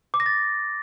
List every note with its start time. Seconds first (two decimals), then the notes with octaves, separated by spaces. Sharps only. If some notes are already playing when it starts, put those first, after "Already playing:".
0.14 D6
0.20 A#6
0.26 A6